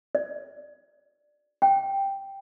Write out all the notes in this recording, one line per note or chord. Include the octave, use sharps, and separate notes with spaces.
D5
G5